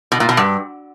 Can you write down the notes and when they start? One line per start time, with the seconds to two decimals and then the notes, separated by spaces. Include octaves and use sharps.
0.12 B2
0.20 A#2
0.29 B2
0.37 G2